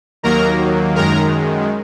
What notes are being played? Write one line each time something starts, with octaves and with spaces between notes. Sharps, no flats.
D#2 D#3 F#3 A#3 A#4 A#5
F#2 D#3 G#3 A#4 A#5